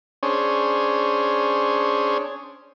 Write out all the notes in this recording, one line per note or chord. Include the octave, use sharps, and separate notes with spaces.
C#4 D4 G#4 C5 C#5